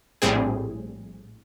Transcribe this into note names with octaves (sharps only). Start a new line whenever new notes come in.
A#1 A2 G3 C4 G#4